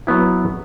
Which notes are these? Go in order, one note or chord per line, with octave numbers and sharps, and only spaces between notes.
F#3 B3 E4